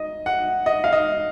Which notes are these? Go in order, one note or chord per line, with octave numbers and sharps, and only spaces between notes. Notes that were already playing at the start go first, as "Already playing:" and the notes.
Already playing: D#4 D#5
F#5
D#5
F5
D#5